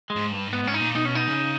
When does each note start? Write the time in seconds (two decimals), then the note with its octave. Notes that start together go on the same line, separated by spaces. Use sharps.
0.10 G#3
0.16 G#2
0.32 G2
0.48 G#2
0.53 B3
0.64 G#2 C#4
0.74 D#4
0.80 A#2
0.95 B2 D#4
1.05 C#4
1.15 D#4
1.27 C#3